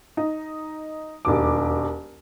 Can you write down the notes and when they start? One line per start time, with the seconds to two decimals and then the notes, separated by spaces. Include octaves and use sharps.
0.17 D#4
1.25 E1 D#2 D6